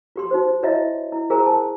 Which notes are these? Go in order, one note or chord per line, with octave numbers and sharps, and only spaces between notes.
F4 G4 C6
D#4 F#4 C5
E4 F4 C#5 D#5 E5
E4
F4 G#4 A#4 C5 G#5 A#5
A5